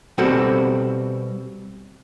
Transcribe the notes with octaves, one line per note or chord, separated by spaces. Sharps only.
B2 G3 C4 F#4 A4